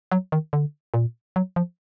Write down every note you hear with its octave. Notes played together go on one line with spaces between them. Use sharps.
F#3
D#3
D3
A#2
F#3
F3